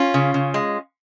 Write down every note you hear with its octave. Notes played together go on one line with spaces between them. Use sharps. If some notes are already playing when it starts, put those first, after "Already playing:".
Already playing: C#4 F4
C#3
C#3
G#3